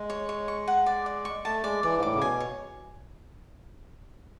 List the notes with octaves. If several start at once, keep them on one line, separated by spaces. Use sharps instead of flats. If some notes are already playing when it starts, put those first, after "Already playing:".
Already playing: G#3
C#5
C#5
C#6
F#5
D5
D5
C#6
A3 A5
G#3 D5
E3 D5
G#2
A2 D6
C#3
B2 G#5
C#5